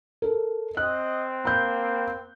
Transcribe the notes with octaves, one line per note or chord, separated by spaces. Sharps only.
A4 A#4
C4 D#5 F#6
A#3 B5 G6